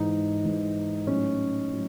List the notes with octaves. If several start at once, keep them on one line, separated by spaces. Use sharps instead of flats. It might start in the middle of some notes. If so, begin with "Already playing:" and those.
Already playing: G#2 E3 D#4
G#2 E3
A2 F#3 C#4
A2 F#3